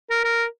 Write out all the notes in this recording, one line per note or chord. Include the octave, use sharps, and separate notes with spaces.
A#4
A#4